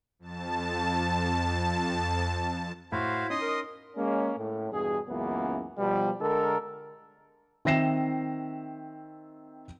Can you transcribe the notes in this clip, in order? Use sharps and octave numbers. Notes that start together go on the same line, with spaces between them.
F2 A5
A2 E4 F#4 C5 F5
C#4 D#4 D#5 C6 D#6
A#4
G#3 A#3 C#4
A2
E2 G2 B2 G#4
C#2 F#2 C#3 E3 A#3 B3
B2 F3 G3
D3 G#3 A4 A#4
D#3 C4 E5 A#6 C7 E7